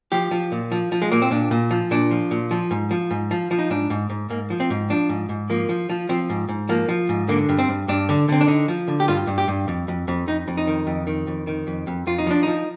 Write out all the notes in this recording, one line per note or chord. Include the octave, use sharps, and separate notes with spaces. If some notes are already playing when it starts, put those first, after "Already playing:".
F3 G4
F3
A#2
F3
F3
G#3
A#2 A#3
C4
A#2 D4
A#2
F3
A#2 D4
F3
A#2
F3
G#2
F3
G#2
F3
F3
D#4
G#2 D4
G#2
G#2
G#2 A#3
F3
C4
G#2
F3 D4
G#2
G#2
F3 A#3
F3
F3
F3 C4
G#2
G#2
F3 A#3
F3
G#2
D3 A#3
G2
C4
G2
G2 D4
D3
D3 C4
D4
D3 D#4
F3
D3
G4
G2 F4
G2
G4
G2
F2
F2
F2
F2 D#4
F2
D#4
D#3
F2
D#3
F2
D#3
F2
F2
F2 F4
D#4
F3 D4
F3 D#4